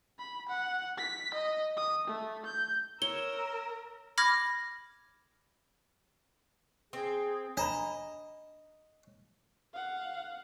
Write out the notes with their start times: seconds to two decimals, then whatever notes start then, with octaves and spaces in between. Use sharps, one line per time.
0.19 B5
0.49 F#5
0.98 B6
1.34 D#5
1.77 D#6
2.08 A3
2.46 G6
3.02 A#4 C#5 E6 G7
4.18 B5 D6 F6 G#6 A#6
6.93 C4 G#4
7.57 D4 D#5 A#5 B5
9.73 F5 F#5